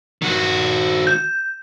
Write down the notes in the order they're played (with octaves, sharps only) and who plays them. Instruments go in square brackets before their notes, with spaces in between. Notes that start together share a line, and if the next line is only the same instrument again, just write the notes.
[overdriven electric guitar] D#3 F#4
[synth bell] G6